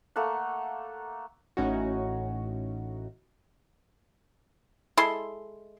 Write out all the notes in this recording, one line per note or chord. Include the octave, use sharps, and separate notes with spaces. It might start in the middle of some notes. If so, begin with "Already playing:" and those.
A3 A#3 A4 F#5
A1 A2 C#4 D#4 F#4
G#3 E4 A4 C6